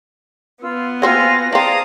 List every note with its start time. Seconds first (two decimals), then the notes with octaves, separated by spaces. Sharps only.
0.62 B3 F4 E6
1.02 A#3 C4 F4 F#4 G#5 E6 A#6
1.53 C4 E4 G#4 D5 F5 A5 A#5 D#6